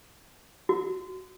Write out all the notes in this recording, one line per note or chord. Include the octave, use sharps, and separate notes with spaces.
F#4